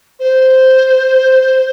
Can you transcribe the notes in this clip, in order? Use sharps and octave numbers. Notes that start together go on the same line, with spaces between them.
C5